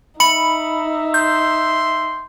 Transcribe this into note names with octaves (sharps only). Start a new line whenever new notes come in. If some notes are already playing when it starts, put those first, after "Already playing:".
D#4 E5 B5 C#7 F#7
C6 G6